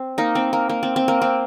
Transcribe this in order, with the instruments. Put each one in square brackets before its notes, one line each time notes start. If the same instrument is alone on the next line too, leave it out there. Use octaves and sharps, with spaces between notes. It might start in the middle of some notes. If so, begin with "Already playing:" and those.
Already playing: [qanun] C4
A#3 D#4
C4
A#3
A#3
C4
C4
A#3
C4